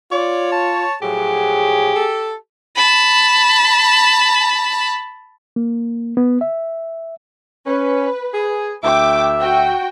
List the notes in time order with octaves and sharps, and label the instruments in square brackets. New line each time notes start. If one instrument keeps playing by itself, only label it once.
[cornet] F4 [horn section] C#5 [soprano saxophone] D5
[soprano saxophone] A5
[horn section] A2 F3 F#3 [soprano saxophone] G4 [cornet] G#4
[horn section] A4
[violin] A5 B5
[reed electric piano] A#3
B3
E5
[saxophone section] C#4 [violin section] B4
[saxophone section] G#4
[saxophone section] D2 E5 [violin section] G5 D6
[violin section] F#4 G5